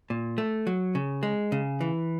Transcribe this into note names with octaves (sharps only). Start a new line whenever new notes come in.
A#2
A3
F#3
C#3
G#3
C#3
E3